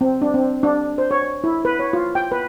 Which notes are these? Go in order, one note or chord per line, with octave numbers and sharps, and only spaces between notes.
C4
D4
C4
D4
C5
C#5
E4
B4
C#5
F4
G5
B4